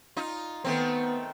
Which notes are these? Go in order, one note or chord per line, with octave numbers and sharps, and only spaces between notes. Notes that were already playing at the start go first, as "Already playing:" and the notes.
D#4 F4
D#3 A3 B3 C4